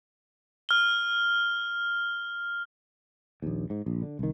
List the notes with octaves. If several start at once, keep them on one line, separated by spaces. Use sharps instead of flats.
F6 G7
A#1 D#2
G#2
A#1
D3
C2 D#3